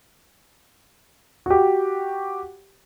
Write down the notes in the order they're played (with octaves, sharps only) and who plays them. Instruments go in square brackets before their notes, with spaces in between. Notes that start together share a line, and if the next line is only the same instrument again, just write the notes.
[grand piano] F#4 G4